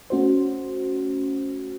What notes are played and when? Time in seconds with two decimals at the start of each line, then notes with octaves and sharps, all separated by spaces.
0.10 A3 C#4 F#4 C5